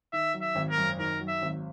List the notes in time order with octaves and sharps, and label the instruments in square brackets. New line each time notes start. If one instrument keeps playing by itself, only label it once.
[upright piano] D#3 [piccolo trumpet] E5
[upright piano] F#3
[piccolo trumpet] E5
[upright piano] G#1
[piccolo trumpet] A#4
[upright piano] F#2
[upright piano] D#3 [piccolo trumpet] A#4
[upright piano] F#3
[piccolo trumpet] E5
[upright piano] G#1